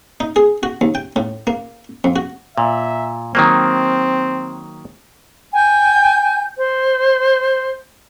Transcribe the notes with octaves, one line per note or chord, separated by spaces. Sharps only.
D#4
G#4
F#4
D#2
G5
A2
A#3
F2
F#4
A#2 E5
D#3 F#3 A#3 C4
G5 G#5 G6
C5